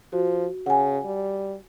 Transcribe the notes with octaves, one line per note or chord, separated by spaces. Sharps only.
F3 F#4
C#3 F#5 G#5
G3